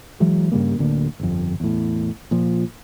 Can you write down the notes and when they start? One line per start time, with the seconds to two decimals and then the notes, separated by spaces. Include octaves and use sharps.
0.20 E3 F#3 G#3
0.52 G2 C#3 G3 A#3
0.78 D1 D2 D3 A#3
1.20 G1 F2
1.60 E2 A2
2.31 A#2 F3